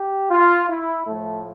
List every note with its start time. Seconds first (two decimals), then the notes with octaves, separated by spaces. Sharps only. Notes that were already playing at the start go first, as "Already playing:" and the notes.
Already playing: G4
0.31 F4
0.68 E4
1.07 A2 F3 A3